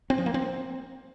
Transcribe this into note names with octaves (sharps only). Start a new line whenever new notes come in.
C4
F3
A#3
C4